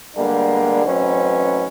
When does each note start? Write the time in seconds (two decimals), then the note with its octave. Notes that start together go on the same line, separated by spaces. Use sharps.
0.16 D3 G3 G#3 A#3 B3 D4
0.86 A1 F#3 C4 C#4 D#4 B4